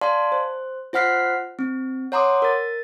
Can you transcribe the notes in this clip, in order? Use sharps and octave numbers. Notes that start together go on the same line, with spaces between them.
D5 F5 G#5 A5 C6
C5
F4 C5 F#5 F6 B6 C7
C4
C#5 F#5 A#5 C6 D6 D#6
A#4 A6